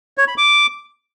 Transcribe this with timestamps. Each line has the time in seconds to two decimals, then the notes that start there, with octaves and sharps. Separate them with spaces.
0.18 C#5
0.28 B5
0.38 D6